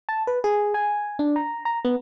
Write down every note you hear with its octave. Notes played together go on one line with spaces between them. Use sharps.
A5
B4
G#4
G#5
D4
A#5
A#5
B3